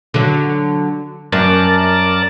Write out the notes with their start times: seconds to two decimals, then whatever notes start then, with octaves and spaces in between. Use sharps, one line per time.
0.14 D3 F#3
1.32 F#2 A#4 D5 A5